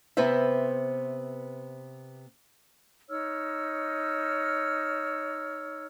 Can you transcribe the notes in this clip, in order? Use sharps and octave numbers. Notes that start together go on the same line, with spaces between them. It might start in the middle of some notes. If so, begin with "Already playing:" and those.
C3 B3 B4 C5 E5
D#4 C#5 E6 F6